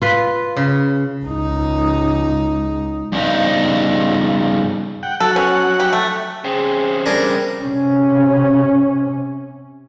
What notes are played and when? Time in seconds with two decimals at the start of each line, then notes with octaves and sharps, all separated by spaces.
0.02 F4 B4
0.57 C#3
1.24 C#2 D#4
3.12 G2 C#3 B3 D#4
5.03 F#5 G5
5.20 F#3 A4 F#5
5.36 B2 C#4
5.80 G4
5.93 A3
6.45 C#3 C4 G#4
7.06 G3 D4 G#4 A#4
7.63 C3 C#4